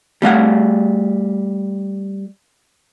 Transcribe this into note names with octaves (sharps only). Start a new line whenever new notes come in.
G3 A3 F5 F#5